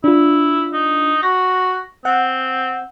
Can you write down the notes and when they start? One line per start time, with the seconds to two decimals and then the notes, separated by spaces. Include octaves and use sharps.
0.04 D4 E4 F4
0.73 D#4
1.23 F#4 A#6
2.05 C4 F#5